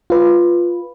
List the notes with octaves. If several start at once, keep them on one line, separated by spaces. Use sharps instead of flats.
F4 B4